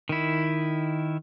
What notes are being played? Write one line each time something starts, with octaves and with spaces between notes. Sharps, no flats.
D#3 E4